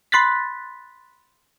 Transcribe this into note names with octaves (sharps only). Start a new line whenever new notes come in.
B5 C6 F#6 A6 B6